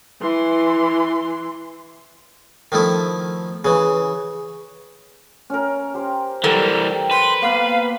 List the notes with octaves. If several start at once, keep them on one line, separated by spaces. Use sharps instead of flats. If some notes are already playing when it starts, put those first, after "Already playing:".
E3 C6
D#3 F3 A3 E4
C#3 E3
C#4 A#4
G4 C5
E3 F#3 G3 A4 A#4
G5
B4 C6
A#3 B3 F5